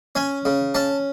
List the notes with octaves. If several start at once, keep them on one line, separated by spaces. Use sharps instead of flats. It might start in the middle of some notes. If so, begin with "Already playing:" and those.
C#4 G#5
C#3
C#4 A5